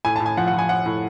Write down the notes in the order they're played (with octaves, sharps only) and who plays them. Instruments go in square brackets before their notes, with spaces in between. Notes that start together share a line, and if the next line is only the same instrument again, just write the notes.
[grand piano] A2 G#5
A5
A2
G#5
F3 F#5
F#5
F3
G#5
F3 F#5
A2